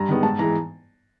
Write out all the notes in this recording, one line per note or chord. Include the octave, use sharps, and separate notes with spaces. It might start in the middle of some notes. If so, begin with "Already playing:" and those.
Already playing: G2 A#5
D#3 G#3 B3
G#2 A5
E3 G#3 A#5